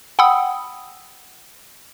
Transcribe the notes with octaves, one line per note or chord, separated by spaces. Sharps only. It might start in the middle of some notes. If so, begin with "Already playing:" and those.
F#5 G5 B5 D#6 E6